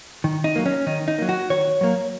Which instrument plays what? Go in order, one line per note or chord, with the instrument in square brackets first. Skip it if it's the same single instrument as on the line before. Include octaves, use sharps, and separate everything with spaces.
[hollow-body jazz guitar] D#3
D#4
F#3 A#3
C#4
D#3 D#4
D#4
F#3 A#3
F#4
D#3 C#5
F#3 A#3